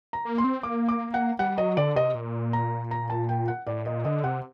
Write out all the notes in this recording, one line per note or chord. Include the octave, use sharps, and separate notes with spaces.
A#5
A#3
C6
C4
A#3 D6
D6
F#5
G3 F#5
F#3 D#5
D3 D5
C3 D#5
A#2
A#5
A#5
A5
G5
F#5
A2 D5
A#2 D#5
D3 D#5
C3 F#5